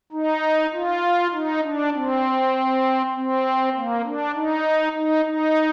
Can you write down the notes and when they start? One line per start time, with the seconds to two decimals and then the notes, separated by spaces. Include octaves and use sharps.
0.12 D#4
0.73 F4
1.33 D#4
1.63 D4
1.94 C4
3.15 C4
3.75 A#3
4.04 D4
4.34 D#4
4.95 D#4
5.25 D#4